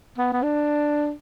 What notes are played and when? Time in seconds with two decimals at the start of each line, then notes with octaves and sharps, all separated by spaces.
0.18 B3
0.33 B3
0.43 D4